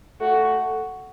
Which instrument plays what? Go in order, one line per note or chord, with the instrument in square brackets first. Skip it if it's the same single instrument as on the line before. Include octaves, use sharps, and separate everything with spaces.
[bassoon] A3 [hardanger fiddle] F#4